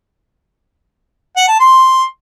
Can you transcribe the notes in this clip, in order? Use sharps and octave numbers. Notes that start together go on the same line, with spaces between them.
F#5
A5
C6